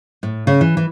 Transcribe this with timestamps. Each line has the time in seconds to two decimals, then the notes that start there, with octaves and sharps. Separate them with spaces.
0.23 A2
0.47 C#3
0.61 E3
0.77 E3